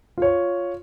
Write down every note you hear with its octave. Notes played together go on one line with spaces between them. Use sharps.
F4 C#5